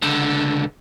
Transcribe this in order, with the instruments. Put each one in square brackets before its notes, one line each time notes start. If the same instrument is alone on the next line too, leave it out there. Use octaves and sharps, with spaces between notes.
[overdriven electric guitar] C#2 D3